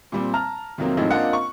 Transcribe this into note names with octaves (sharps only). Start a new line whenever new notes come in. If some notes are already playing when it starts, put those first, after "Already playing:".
A#2 G3 C4
A5 A#5 F6
F2 C3 D#3 F#3 A#3 C4
A2 F3 G#3 C4 D#4
A#3 C4 D4 F4 D#5 F#5
C#6